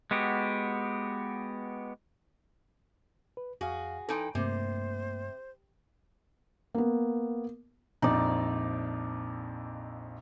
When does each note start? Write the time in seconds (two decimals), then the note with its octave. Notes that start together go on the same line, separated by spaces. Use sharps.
0.11 G#3 B3 F#4 G4
3.37 B4
3.61 F2 F#4 G#4 F5
4.09 E3 D#4 A4 G5 C6
4.35 G2 C3 A3 A#3 C5
6.75 A#3 B3
8.02 A#1 F2 D#4 D5